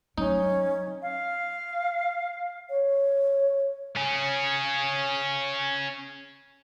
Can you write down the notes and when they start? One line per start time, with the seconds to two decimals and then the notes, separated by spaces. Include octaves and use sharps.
0.18 F#3 C#4 D#4
1.02 F5
2.70 C#5
3.96 C#4 G#4